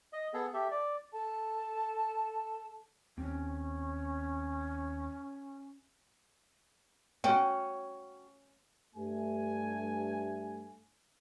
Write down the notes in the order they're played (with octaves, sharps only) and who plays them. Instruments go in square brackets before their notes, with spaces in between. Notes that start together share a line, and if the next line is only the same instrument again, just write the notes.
[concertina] D#5
B3 G#4 A4
G4 A4 E5
D5
[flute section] A4 A5
[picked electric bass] D#2 C4 [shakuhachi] C#4
[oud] C#4 [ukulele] F#4 G5
[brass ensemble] G2 A3 G#5